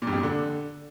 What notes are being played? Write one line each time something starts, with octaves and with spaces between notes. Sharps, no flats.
A#2
G2
F2
A#2
D3